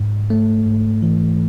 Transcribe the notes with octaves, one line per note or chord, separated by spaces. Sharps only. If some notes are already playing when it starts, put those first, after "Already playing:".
Already playing: G#2
A3
G#2
E3